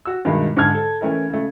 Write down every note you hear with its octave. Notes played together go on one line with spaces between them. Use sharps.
F#4 E6
G2 B2 D#3 G#3 E4
G#2 D3 E4 A5 F6 G#6
A4
E3 A3 C#4 E4 A#4
C#3 A3